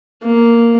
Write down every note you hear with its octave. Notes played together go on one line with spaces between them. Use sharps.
A#3